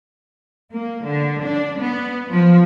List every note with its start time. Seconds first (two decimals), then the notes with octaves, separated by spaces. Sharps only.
0.73 A#3
1.05 D3
1.43 D4
1.80 B3
2.31 F3